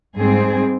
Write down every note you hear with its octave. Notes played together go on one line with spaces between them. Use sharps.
G#2 G3 C4 G#4